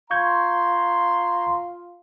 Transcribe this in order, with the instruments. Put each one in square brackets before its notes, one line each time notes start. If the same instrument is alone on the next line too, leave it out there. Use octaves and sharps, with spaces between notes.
[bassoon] F4 [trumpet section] A#5 C6 [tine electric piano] C#6 G6 G#6